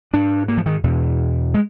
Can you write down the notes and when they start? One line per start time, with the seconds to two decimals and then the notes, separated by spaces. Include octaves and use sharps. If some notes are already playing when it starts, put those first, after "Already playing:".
0.13 G#2 D4
0.48 A#3
0.57 F3
0.66 D#3
0.83 E2 B2
1.54 G#3